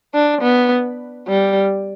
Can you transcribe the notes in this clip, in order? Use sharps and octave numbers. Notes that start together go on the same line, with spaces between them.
D4
B3
G3